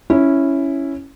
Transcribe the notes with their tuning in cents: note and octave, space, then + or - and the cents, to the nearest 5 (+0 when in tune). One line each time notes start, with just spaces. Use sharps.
C#4 +0 E4 +0